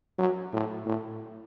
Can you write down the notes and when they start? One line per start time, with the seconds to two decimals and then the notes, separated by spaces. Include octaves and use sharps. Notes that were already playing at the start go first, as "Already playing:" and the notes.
0.18 F#3
0.53 A2
0.86 A2